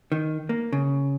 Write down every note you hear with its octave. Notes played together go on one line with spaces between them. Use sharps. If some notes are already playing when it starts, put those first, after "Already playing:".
D#3
A#3
C#3